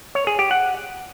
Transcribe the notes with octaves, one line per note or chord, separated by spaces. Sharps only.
C#5
G#4
G4
F#5